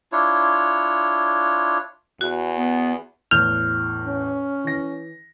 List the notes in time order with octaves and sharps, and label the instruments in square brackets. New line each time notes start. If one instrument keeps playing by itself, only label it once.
[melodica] D4 E4 F4 C#5
[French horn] E2 [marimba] F#4
[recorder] B3
[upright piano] E2 A2 G6 [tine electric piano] F6
[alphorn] C#4
[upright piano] E3 A#6